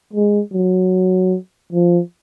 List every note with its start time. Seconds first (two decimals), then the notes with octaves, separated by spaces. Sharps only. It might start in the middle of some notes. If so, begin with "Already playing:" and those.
0.13 G#3
0.53 F#3
1.72 F3